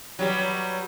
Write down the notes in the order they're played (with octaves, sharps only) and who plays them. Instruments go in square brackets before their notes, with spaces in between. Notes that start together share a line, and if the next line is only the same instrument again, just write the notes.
[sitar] F#3 G3 B3